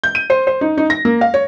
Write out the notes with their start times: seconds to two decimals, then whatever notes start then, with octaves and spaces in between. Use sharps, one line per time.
0.04 G6
0.15 D#7
0.30 C5
0.47 C5
0.61 D#4
0.78 D#4
0.90 A#6
1.05 A#3
1.21 F5
1.34 C#5